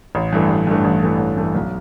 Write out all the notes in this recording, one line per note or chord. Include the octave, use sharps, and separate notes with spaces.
A1
G2 E3 A3
A1
G2 E3 A3
A1
G2 E3 A3
A1
G2 E3 A3
B1